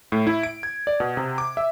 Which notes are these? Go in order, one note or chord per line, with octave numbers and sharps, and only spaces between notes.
A2
E4
D7
G#6
D5
B2
C3
D6
E5